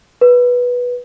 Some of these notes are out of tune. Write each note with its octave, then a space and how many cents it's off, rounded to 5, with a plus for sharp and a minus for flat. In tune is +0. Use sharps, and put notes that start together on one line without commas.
B4 -10